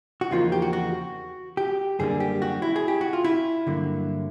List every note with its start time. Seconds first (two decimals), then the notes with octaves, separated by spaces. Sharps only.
0.21 F#4
0.31 E2 C#3 F3 A#3 D#4 F4
0.52 G4
0.62 F#4
0.73 F#4
1.57 G4
1.99 F#2 D3 G3 A#3 D4 G#4
2.20 G4
2.42 F#4
2.62 E4
2.76 G#4
2.88 G4
3.01 F#4
3.13 F4
3.24 E4
3.67 G2 D3 F#3 A#3